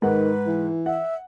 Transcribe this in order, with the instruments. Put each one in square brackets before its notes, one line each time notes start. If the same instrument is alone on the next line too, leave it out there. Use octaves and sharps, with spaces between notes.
[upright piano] G#2 F#5 [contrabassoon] D#3 [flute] B4
[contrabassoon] E3
[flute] E5 [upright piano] F#5